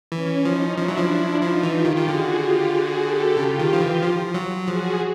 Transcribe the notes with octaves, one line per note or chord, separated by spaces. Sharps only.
E3 C#4
F3 C#4 D#4
F3 D4 E4
F#3
F3
F3 D#4 F4
E3
F4 G4
D#3
D#3
D3 F#4 G#4
F4 G4
F#4 G#4
G4 A4
C#3 F4 G4
D#3
F3
E3
F3
F#3
F3 F#4 G#4